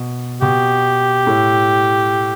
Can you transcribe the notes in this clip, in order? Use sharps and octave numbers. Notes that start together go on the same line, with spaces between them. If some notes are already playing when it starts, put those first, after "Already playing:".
Already playing: B2
B2 G4
A2